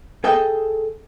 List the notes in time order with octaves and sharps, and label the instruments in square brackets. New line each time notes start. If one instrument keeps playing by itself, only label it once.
[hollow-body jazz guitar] G#4 A4 D#5 G5